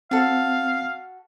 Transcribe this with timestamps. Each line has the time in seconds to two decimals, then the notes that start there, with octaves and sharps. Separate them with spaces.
0.11 C4 F#4 A4 F5